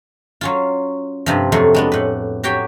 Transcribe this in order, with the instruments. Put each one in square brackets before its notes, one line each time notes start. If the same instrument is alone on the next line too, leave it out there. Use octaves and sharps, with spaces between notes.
[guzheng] F#3 C#4 F4
G2 C3 F3
F2 C3 F#3 A3 C6
G#3 B3 D4
A2 B4
F#3 F#4 G4 C#5 G5